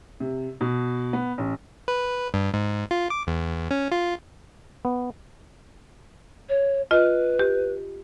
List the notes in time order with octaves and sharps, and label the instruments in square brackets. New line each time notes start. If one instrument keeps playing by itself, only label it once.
[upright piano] C3
B2
B3
A1
[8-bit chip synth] B4
G2
G#2
F4
D6
E2
C#4
F4
[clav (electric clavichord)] B3
[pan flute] C#5
[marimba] F4 D#5 [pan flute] B4
[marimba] G4